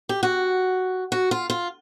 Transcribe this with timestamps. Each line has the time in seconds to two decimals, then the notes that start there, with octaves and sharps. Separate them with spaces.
0.09 G4
0.23 F#4
1.12 F#4
1.31 F4
1.50 F4